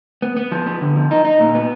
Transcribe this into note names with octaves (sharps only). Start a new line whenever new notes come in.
B3
B3
F3
B3
D3
F3
D#4
D#4
A#2
B3